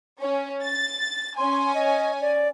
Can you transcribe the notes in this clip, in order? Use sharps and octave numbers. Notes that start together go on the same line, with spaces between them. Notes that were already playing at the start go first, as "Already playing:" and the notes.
C#4
A6
C#4 G#5 C6
D#5
D5